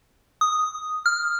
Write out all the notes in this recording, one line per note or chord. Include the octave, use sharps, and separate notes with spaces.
D#6
F6